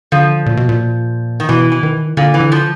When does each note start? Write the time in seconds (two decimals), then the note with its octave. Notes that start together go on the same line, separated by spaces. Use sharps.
0.12 D3 F3
0.46 A#2
0.57 B2
0.69 A#2
1.40 D#3
1.49 B2 E3
1.72 E3
1.83 D#3
2.17 A#2 D3
2.34 E3
2.40 D3
2.52 F3